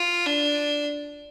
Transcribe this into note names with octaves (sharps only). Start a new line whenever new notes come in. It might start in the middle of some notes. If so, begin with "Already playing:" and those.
Already playing: F4
D4